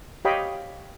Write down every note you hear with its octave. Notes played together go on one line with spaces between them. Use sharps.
G4 C#5 D#5 F5 G5 B5